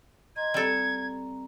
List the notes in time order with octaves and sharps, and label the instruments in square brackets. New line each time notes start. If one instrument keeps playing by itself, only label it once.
[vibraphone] D#5 A#5 C6 [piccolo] G#6
[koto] G3 A4 [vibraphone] C4 A#5